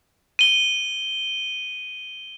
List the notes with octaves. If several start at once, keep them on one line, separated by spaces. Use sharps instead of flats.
D#7 G7